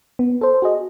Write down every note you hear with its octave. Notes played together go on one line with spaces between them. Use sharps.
B3
A4 C5
F#4 G#4 D#5